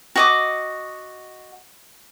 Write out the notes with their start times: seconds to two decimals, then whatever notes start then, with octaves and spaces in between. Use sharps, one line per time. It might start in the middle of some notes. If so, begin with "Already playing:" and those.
0.16 F#4 D#5 D6